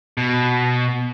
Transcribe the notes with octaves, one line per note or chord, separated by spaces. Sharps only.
B2